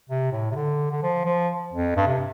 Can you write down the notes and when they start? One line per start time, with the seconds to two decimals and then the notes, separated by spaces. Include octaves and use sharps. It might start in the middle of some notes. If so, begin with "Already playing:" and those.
0.09 C3
0.32 A2
0.51 C3
0.55 D3
0.91 D3
1.03 F3
1.25 F3
1.72 F2
1.96 G2
2.07 C3